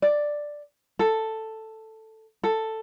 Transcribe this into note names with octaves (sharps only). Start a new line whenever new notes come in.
D5
A4
A4